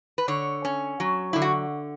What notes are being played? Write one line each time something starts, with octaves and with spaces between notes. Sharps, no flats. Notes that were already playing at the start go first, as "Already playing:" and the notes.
B4
D3 C#5
C#4
F#3
D3 E4
F#4